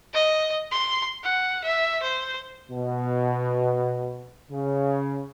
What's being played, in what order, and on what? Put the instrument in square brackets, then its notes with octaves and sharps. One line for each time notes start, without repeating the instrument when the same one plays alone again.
[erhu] D#5
C6
F#5
E5
C5
[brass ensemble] B2
C#3